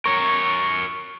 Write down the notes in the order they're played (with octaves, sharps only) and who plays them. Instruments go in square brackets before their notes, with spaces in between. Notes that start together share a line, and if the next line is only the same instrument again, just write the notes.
[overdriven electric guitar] A#4 C#5 [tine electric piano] C#6